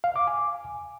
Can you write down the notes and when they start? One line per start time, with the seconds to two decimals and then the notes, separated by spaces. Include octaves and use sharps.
0.04 F5
0.16 D6
0.27 G#5